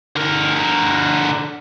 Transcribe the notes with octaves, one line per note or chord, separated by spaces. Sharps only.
D3 A#4